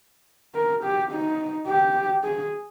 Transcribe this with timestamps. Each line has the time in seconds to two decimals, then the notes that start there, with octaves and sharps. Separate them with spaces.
0.55 A#4
0.84 G4
1.12 D#4
1.68 G4
2.23 G#4